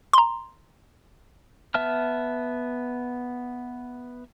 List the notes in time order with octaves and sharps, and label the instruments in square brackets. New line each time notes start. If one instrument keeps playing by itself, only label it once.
[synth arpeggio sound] A#5 C6
[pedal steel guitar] B3 E5 A5 F6